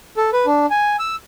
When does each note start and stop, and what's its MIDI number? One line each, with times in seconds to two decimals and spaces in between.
0.17 0.30 69
0.33 0.46 71
0.46 0.66 62
0.70 0.96 80
0.99 1.16 88